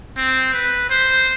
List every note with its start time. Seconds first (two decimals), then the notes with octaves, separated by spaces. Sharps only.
0.17 C4
0.53 B4
0.90 C5